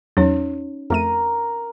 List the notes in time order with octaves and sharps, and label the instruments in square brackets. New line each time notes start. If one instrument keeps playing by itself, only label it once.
[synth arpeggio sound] E2 F#3 [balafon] C#4 D#4 C#5
[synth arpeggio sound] F2 A3 D#7 [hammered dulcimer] A#4